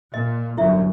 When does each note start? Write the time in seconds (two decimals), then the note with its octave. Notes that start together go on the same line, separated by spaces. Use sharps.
0.14 A#2 D#5
0.58 G1 F#2 E4 E5